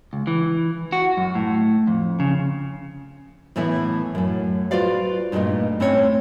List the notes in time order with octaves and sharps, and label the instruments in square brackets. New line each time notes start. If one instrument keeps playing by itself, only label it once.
[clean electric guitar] C#2
E3
F#4
F#2
A2
F2
C#3
[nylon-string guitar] A2 E3 A3 B3 E4
F#2 A2
F4 F#4 B4 C5 D5 F5
G2 A#2 A3 D#4 D#5
A2 C4 C#4 C#5